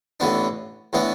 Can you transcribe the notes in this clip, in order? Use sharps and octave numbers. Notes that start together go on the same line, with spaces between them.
A1 A2 E3 B3 D4
A2 E3 B3 D4